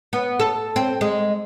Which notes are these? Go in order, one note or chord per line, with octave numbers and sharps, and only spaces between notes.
B3
A4
C4
G#3